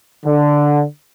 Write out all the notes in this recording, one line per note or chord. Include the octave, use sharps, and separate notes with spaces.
D3